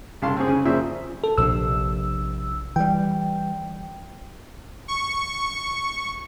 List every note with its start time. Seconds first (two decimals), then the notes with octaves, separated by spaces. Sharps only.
0.22 C2 C#3 F5 A5 C6
0.37 C4 C#4 G#4
0.48 C#3 G#5
0.65 A#2 C#3 F3 C4 C5 E5
1.24 A4
1.38 A#1 C3 E6
2.76 E3 G3 G5
4.88 C#6